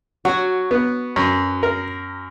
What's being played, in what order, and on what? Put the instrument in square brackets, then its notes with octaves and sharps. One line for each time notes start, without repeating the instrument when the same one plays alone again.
[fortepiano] F#3 [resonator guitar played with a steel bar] F#4
[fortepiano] B3
F#2
A#4